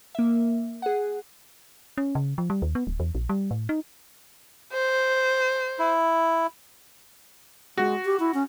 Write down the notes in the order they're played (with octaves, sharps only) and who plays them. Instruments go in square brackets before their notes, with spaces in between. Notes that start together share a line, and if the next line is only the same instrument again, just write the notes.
[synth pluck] A#3 E5
G#4 F#5
[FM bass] C#4
C#3
F3
G3
D#2
B3
D1
E2
A#1
G3
A2
D#4
[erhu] C5
[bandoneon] E4
[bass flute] G#3 [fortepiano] F#4
[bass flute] G4
E4
C#4